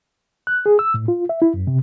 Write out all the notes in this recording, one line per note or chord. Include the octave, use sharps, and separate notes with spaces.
F#6
G#4
E6
A2
F4
E5
E4
F#2
C3